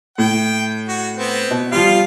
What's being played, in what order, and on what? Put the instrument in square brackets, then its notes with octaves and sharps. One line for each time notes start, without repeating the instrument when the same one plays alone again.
[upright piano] A2 [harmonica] G5
[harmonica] F#4
B3 C4
[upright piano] B2
[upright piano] F3 G3 [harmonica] F4 F5